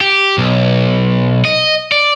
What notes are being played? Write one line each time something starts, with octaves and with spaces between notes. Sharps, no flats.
G4
B1
D#5
D5